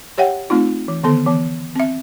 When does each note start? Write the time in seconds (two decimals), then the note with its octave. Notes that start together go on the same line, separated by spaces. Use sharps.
0.18 G4 C#5 E5 F#5 G5
0.50 A3 C4 D#4 F4
0.88 E3
1.03 D3 D#3 B3 A4
1.26 E3 B3
1.76 C4 E5